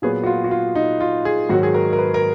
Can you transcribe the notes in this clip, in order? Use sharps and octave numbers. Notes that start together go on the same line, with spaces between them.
A#2 F#3 B3 G#4
F#4
F4
F#4
F4
D#4
F4
G#4
G#2 D#3 F#3 F#4
G#4
A#4
A#4
B4
A#4